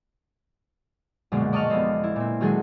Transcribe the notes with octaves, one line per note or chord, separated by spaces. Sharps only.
A#1 F#2 B2 D3 G#3
D5 D#5 A5 C#6 D#6 F6
F1 B3 C4
E4
A#2 C4
D#3 F#3 G#3 D4 G#4 A4